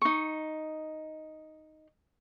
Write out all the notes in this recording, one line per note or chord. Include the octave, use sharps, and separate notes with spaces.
D#4 C#6